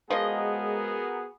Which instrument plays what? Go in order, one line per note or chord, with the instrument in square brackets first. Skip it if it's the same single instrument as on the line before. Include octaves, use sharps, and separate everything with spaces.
[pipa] F3 D#5 [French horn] G#3 [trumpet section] B3 F#4 G#4 [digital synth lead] A#4